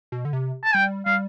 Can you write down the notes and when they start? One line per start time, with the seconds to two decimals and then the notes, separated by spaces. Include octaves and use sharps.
0.12 B2
0.25 D3
0.33 C3
0.64 A5
0.74 G3 G5
1.06 G3 F5